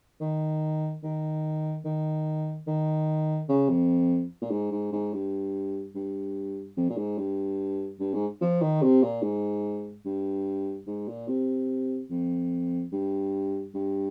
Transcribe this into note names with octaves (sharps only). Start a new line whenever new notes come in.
D#3
D#3
D#3
D#3
C#3
F2
A#2
G#2
G#2
G#2
G2
G2
F2
A#2
G#2
G2
G2
G#2
F3
D#3
C3
A#2
G#2
G2
G#2
A#2
C3
F2
G2
G2